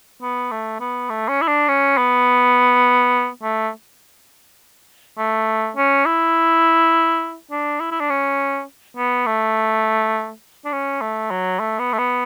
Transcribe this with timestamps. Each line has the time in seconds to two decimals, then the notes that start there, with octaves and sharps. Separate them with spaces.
0.22 B3
0.51 A3
0.80 B3
1.10 A3
1.29 C#4
1.42 E4
1.48 D4
1.68 C#4
1.97 B3
3.43 A3
5.18 A3
5.76 C#4
6.06 E4
7.51 D4
7.80 E4
7.91 E4
8.00 D4
8.10 C#4
8.97 B3
9.26 A3
10.65 D4
10.72 C#4
11.01 A3
11.31 F#3
11.59 A3
11.79 B3
11.93 A3
11.99 B3